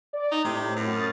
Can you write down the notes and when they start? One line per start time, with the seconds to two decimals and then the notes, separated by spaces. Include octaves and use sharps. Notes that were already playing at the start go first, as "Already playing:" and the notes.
0.13 D5
0.31 D#4
0.44 A2 C3
0.76 F#2
0.92 D#6 F6 A6